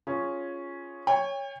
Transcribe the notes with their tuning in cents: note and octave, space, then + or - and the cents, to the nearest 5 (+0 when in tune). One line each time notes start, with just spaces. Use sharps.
C#4 +0 F4 +0 G#4 +0
C#5 +0 G5 +40